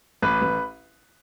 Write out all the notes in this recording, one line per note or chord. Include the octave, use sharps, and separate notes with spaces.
A1 B4
A1